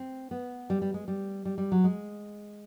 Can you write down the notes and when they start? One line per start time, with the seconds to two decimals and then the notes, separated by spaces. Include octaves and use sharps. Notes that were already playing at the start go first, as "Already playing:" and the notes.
Already playing: C4
0.31 B3
0.70 G3
0.82 G3
0.94 G#3
1.08 G3
1.45 G3
1.58 G3
1.72 F#3
1.84 G#3